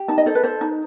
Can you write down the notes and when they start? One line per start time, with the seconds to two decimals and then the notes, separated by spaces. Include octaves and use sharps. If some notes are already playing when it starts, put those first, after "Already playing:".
Already playing: G4
0.08 D#4 A5
0.18 D#5
0.26 A4 C5
0.35 B4
0.44 A4 C5
0.61 D#4